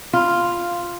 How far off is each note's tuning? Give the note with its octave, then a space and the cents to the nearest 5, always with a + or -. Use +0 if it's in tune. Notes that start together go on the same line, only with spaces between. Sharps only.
F4 -5